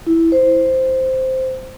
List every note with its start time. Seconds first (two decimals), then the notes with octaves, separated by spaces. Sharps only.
0.07 E4
0.32 C5